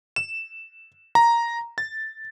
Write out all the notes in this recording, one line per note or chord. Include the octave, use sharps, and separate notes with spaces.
E7
A#5
A6